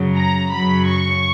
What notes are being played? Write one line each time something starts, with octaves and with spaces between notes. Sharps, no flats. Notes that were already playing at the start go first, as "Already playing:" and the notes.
Already playing: F#2 C#3 F#3
A#5
F#2 C#3 F#3 B5
C#6